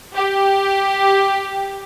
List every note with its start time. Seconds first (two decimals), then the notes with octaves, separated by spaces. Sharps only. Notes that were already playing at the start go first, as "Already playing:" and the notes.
0.15 G4